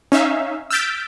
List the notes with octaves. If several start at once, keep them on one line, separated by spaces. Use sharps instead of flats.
C#4 D#4 E5 F5
E6 F6 G6 A6 B6 D7